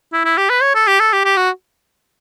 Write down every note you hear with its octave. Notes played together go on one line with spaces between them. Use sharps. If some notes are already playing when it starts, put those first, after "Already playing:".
E4
E4
G4
B4
C#5
A4
G4
A4
G4
G4
F#4